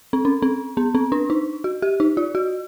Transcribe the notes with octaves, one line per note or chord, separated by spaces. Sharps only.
C4
C#4
C4
B3
C4
D4
D#4
F#4
G4
D#4
F4
F#4